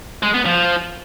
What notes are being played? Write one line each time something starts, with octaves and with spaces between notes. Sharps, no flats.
G#3
B3
F3